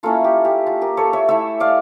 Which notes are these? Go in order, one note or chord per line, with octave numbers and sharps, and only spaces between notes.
A#3 C#4 E4 F4 A4
G4
G4
F4
G4 A#4
A4 C#5
C#5 E5
A3 E4 C#5 E5
D5 F5